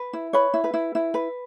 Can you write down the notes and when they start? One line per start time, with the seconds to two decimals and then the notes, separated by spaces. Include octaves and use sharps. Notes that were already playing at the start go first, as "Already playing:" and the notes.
Already playing: B4
0.13 E4
0.33 B4 C#5
0.54 E4
0.64 B4
0.74 E4
0.95 E4
1.14 B4